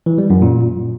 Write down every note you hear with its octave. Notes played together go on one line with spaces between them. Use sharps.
E3
G3
F#2
A#2